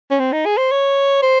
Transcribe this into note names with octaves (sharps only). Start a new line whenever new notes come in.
C#4
C4
D#4
G#4
C5
C#5
C5